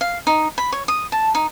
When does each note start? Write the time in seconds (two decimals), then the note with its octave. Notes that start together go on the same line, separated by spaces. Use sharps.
0.01 F5
0.27 D#4
0.58 B5
0.72 C#5
0.88 D#6
1.12 A5
1.35 D#4